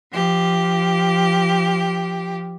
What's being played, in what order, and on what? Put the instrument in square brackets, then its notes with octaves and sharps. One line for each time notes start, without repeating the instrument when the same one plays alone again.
[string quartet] F3 G4